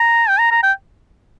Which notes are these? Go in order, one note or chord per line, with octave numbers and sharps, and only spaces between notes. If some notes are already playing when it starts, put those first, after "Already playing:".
Already playing: A#5
G5
A#5
A#5
G5